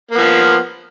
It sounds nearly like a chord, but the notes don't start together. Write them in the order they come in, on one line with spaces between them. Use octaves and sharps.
A#3 B3 F3